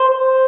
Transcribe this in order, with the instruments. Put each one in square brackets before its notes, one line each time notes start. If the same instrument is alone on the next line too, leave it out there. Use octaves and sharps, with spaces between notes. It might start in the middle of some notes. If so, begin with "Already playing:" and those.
Already playing: [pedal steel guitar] C5